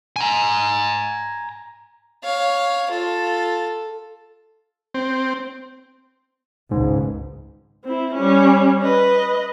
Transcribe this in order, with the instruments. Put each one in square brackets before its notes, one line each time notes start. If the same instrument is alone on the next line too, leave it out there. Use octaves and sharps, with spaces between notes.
[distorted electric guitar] G#5 A#5
[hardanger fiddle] C#5 F5
F4 A4
[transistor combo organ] C4
[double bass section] G#1 C#2 [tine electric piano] G#2
[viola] C4 E4
G3 C#4
B4 D#5